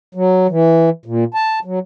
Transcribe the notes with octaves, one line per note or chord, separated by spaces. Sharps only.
F#3
E3
A#2
A5
F#3